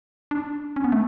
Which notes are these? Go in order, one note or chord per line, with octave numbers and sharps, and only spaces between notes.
D4
C#4
B3
A3